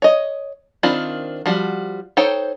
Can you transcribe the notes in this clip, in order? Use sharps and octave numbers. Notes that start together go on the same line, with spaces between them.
C#5 D#5
D#3 C4 D4 F4 B5
F3 G3 F#4
D#4 A4 C5 C#5 G5